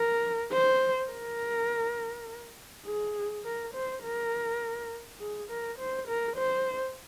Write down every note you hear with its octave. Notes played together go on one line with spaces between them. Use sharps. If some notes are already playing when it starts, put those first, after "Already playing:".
Already playing: A#4
C5
A#4
G#4
A#4
C5
A#4
G#4
A#4
C5
A#4
C5